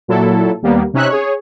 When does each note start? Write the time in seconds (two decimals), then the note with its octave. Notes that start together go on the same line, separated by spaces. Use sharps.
0.08 A#2 F#3 E4 A4
0.62 D#2 G3 A#3 B3
0.94 C3 C#4 D#4 E5 F#6
1.09 G#4 C#5